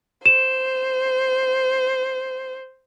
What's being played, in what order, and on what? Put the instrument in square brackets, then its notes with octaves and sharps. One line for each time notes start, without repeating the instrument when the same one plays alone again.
[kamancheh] C5 [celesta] E7